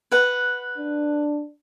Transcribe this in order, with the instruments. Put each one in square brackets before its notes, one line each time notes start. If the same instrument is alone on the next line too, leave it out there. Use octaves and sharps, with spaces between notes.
[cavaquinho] B4 F#5
[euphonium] D4